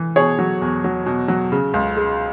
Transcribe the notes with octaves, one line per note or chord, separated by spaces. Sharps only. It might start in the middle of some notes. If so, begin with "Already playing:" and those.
Already playing: E3
B2 G#4 C#5
F#3
E2
F#3
B2
F#3
C#3
C#2
G#3